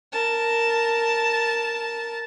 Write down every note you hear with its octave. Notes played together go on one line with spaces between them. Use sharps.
A#4 A5